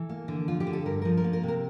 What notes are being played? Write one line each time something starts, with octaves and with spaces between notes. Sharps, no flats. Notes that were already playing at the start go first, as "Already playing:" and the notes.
Already playing: E3 A4
A#3
D3
F2 F4
G4
D3
A4
G2 A#4
A#4
F3
A#4
A#3
A#4
C3 A#4